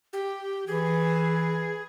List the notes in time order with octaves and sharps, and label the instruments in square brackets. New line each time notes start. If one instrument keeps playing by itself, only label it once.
[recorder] G4
[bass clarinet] E3 [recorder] G#4